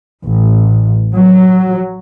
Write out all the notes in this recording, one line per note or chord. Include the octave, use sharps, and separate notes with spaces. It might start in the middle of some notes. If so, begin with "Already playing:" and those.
A1
F#3